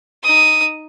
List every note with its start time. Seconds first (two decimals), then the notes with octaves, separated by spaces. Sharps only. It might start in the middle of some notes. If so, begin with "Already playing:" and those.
0.23 D#4 D#6